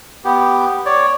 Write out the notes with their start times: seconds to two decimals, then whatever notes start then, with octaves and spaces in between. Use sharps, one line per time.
0.25 B3 G4
0.86 C#5 D5